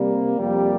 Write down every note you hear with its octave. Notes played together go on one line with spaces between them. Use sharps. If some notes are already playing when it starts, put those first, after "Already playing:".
Already playing: C3 G3 A#3
F2 C3 G3 A#3 G4